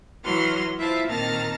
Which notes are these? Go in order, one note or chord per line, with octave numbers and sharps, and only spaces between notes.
E3 F#3 F#4 C6 F6
E4 F4 C5 E5 F5 A5
A#2 D#3 C4 A5 A#5 F6